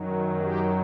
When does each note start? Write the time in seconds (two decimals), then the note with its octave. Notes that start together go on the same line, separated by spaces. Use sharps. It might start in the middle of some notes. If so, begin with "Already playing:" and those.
Already playing: F#2 D#3 F#3
0.42 G4